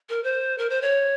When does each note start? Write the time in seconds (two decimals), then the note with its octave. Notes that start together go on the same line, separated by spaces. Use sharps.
0.09 A#4
0.24 C5
0.58 A#4
0.70 C5
0.82 C#5